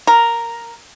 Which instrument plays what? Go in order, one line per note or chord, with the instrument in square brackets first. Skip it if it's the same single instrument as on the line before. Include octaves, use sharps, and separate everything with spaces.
[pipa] A#4